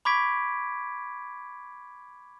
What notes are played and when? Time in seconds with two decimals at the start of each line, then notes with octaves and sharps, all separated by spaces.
0.05 B5 C#6 D6 G#6 B6 D7